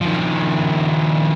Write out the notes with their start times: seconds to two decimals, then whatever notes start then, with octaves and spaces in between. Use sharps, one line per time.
0.01 D#3 F3